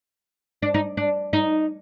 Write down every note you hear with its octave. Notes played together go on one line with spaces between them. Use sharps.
D4
D#4
D4
D#4